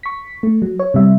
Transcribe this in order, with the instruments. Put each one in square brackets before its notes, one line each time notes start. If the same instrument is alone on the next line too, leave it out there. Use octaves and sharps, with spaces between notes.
[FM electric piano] C#6 B6
A3
F#3
C#5
C3 G3 E5